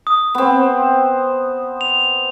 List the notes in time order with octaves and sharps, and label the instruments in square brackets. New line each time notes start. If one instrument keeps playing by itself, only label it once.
[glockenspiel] D#6
[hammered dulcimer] B3 C4
[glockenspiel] F7